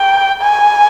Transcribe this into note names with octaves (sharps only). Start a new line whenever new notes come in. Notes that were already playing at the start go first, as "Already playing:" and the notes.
Already playing: G5
G#5